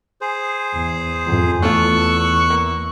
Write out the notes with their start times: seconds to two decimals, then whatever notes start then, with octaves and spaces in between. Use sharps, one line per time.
0.21 G#4 C5
0.74 E2
1.26 F2
1.62 E2 A3 F4 C#6 E6 F#6
2.50 A#3